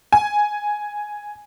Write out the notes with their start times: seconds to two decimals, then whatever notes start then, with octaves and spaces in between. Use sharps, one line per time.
0.12 G#5